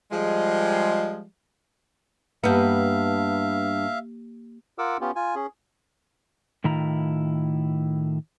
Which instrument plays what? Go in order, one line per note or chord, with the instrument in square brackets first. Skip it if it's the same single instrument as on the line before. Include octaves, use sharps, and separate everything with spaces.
[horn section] F3 G3 G#3
[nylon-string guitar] G2 B3 [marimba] A#3 G4 [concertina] E5 F5
[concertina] F4 A#4 F#5 D6 E6
B3 C#4 F4 G4
F4 G#5
C#4 G#4
[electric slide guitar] A2 D#3 E4 F4 A#5